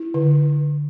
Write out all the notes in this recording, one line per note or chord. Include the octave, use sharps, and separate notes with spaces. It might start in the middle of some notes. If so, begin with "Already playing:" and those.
Already playing: E4
D3